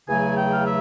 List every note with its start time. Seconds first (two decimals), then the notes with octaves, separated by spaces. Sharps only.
0.08 E2 C#3 F#3 A3 G#5
0.36 G5
0.52 F5
0.64 E5